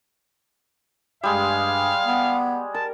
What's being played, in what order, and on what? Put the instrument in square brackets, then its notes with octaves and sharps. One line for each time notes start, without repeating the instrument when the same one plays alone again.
[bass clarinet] G2 [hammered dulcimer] G3 G#3 [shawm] F5
[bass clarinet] B3
[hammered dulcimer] A#4 [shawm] A5